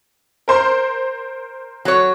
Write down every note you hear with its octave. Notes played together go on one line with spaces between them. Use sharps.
A#4 C5 C6
F#3 C#5